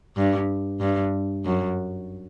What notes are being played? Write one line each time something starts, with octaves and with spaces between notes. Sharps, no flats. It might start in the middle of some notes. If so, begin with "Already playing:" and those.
G2
G2
F#2